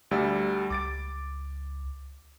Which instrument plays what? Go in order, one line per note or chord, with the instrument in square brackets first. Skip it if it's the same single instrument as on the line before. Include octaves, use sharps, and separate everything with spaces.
[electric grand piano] D2 G3 E6
[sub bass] C#2 [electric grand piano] D6 A6 D7